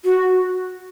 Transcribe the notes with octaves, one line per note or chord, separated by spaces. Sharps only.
F#4